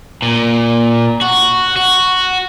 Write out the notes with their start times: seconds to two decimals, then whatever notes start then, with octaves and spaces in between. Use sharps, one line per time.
0.22 A#2
1.21 F#4
1.76 F#4